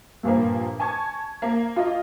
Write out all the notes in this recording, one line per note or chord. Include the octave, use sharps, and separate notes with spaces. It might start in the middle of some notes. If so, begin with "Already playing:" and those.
G2 A#2 F3 A#3
G#5 A5 C#6 G#6
A#3
F4 D#5